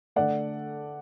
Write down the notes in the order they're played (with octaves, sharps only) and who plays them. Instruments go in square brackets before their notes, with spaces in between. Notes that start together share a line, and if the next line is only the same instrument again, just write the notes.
[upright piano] D3 A3 D5 F#5